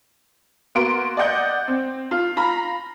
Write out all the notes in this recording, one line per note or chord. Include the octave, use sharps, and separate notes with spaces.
A#3 B3 F#4 C6 D7
D5 D#5 F#5 G6
C4
F4
F4 A#5 B5